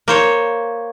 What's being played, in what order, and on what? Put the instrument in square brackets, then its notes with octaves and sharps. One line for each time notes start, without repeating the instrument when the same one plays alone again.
[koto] A#3 C5 C#5